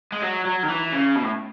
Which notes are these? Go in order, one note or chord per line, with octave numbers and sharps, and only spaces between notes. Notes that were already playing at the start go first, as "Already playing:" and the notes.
G#3
F#3
F#3
D#3
E3
C#3
B2
A2